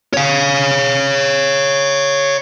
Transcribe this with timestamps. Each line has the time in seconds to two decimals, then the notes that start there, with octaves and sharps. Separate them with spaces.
0.14 C#5 F5